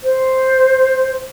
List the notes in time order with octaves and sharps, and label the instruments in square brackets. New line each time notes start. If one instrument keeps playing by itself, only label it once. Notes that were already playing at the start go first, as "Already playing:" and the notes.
[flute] C5